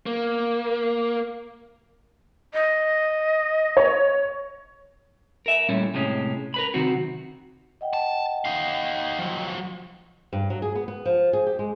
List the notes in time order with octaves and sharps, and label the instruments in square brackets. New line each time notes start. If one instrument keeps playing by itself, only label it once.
[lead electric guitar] A#3
[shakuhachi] D#5
[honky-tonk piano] C#5
[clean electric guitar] A#4 E5
A#2 G3 A3 C#4 E4
A2 C3 G#3 C#4
A#4 B4 B5
C3 D#3 F#3 C4 F#4
[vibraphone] D#5 F#5 G5
[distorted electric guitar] A5
D#4 F5
F3 F#3
[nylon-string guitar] G2
F#3
G#4
B3
B3
F3
G#4
G4
G#3